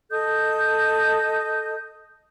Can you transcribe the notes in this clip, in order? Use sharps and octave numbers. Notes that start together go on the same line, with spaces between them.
A4 D#5 D#6 G6